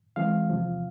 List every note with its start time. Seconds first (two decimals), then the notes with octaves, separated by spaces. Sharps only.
0.16 E3 G#3 C4 F5
0.49 E2 C3 F3